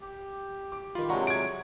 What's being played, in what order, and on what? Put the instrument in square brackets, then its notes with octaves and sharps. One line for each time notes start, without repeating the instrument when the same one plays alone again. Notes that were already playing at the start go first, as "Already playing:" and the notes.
[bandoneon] G4
[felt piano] D6
[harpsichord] D#3 B5 [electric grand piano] F4
[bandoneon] C3 F#3 G#3 [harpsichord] D4 G4 [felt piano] F#5 A#5 C#6
[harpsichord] F#4 [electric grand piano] G#6 D7